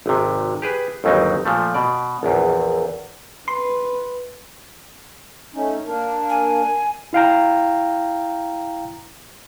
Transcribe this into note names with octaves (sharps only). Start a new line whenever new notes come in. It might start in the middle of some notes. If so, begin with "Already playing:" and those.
G#1 C3
G4 G#4 B4
G1 D#2 F#3 C4 D#4
A#2 F3 A3
B2 D5
A#1 E2
B4 C6
A3 C#4 D#4
A#3 D4 A#4
G#5
E4 F5 G5 A#5